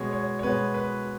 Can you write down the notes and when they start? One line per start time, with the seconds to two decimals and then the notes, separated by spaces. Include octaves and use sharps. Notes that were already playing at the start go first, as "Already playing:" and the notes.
Already playing: B2 G#3 B3 C#5
0.13 C#5
0.39 C#5
0.43 B2 G#3 B3 B4
0.74 B4